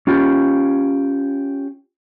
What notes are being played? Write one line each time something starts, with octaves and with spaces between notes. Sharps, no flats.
C#4 F4 G4